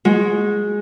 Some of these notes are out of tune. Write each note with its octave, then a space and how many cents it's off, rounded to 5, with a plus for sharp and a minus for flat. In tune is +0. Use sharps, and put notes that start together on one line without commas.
G#3 +0 F#4 -25